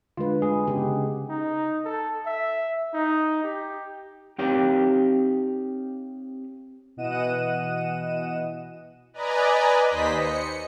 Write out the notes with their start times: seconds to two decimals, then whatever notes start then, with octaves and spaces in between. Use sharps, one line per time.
0.17 D3 G#3 F4 B4
0.42 G#3 G#4
0.68 C#3 B3 G4 G#4
1.29 D#4
1.85 A4
2.26 E5
2.94 D#4
3.43 G4
4.38 C4 D#4 G4 C#5 F5 G5
6.97 B2 E3 D#5 F#5 D#7 E7
9.14 B4 D5 D#5 G#5 A#5
9.88 D#2 C5 D#5 B6
10.17 C#7